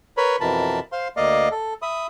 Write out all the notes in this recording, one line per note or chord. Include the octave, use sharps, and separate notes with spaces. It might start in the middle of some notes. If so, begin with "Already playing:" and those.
A#4 B4 C#5 B5
F2 B2 E3 A#4 A5 B5
C5 F5 C6
D2 A#3 D5 D#5 F5
A4
E5 B5 D#6